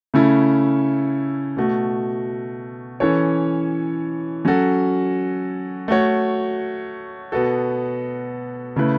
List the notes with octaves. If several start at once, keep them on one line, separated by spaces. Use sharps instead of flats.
C#3 A3 C#4 E4 A4
B2 A3 F#4
E3 C#4 A4 C#5
F#3 C#4 F#4 A4
A3 F#4 C#5
B2 B3 F#4 A4
C#3 A3 E4 B4